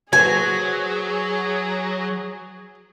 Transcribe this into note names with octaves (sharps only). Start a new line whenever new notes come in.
F#3 F#4 G#4 B4 C5 G#5